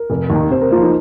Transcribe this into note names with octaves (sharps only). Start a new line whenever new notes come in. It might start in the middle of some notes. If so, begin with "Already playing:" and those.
Already playing: A#4
F1
D#2 D#3
C3 C5
A#4
F3 A#3 F4
D#4